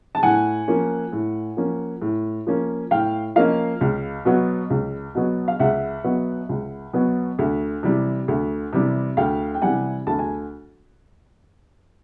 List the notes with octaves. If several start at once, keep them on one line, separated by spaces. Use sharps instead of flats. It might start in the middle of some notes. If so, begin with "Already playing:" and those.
A5
A2 F#5 G#5
F3 A#3 C#4
A2
F3 A#3 C#4
A2
F3 A#3 C#4
A2 F5 G5
F3 A#3 C#4 D#5 F5
C#2
B2 F#3 B3
C#2
B2 F#3 B3
F5
C#2 E5 F#5
B2 F#3 B3
C#2
B2 F#3 B3
D2
C3 E3 G3
D2
C3 E3 G3
D2 F5 G5
G5
C3 E3 G3 F#5 G#5
D2 A5
G#5